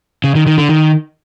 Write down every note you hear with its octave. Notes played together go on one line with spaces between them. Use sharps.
C#3
D#3
D#3
D3
D#3